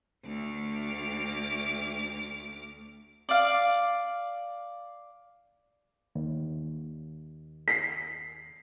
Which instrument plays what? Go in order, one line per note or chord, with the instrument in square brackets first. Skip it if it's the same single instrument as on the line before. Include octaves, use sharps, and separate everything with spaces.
[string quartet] D2 D6 F6
[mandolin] D5 F5
[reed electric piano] D#2
[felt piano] B6 C7